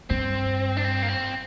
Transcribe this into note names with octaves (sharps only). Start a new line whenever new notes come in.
G2 C4
D4
C4
A#3
C4